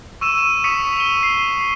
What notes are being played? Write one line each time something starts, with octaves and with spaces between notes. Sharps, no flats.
C#6 E6 D#7 E7
E7
C#6 D#6 B6 C#7
D#7 G7
C7